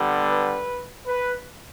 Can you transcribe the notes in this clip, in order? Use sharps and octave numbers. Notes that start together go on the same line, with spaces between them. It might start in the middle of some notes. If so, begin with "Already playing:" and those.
Already playing: D3 G3 B3
B4
B4